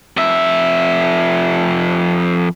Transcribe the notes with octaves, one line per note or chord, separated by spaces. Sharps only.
F2 E5